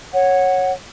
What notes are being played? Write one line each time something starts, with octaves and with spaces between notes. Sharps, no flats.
C#5 F#5